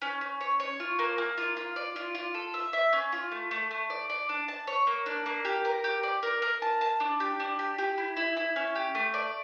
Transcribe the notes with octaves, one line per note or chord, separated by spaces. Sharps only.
C#4
C#4
C#5
C#5
F4
A#3
A#3
F4
F4
D5
F4
F4
A4
E5
E5
C#4
F4
A3
A3
A3
D5
D5
D4
A5
C#5
A#3
D4
A#3
G4
A#4
G4
D5
A#4
A#4
A5
A5
D4
G4
D4
G4
G4
E4
E4
E4
C#4
G4
A3
D5